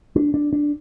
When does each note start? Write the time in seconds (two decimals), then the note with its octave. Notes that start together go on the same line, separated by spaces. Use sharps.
0.16 D4
0.34 D4
0.53 D4